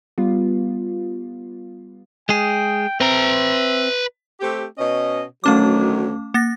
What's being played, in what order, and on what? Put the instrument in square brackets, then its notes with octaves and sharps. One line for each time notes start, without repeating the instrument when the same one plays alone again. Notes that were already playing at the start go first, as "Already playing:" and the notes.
[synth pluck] G3 B3 F4
[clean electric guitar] G#3 G#4 [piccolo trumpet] G5
[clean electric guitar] C4 [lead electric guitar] B4 A#5 [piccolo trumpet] E5
[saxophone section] A3 C4 G4
B2 C#4 D#5
[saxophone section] D2 D#3 F#3 [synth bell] A3 C#4 D6
[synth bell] A#3 A6 A#6